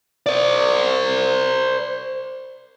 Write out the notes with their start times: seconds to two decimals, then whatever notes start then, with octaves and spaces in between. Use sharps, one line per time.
0.26 C5 D5